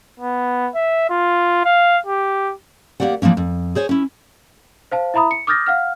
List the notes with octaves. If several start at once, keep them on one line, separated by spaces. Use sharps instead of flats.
B3
E5
F4
F5
G4
D#2 G#3 A#3 G4 D5 F#5
E3 F3 G3 A#3 C#4
F2
G#4 C5 C#5 G#5
C#4 E4
C5 F5 A5
E4 E5 A#5 B5 D#6
C#7
D6 D#6 F6 G6 A6 A#6
F5 F#5 F6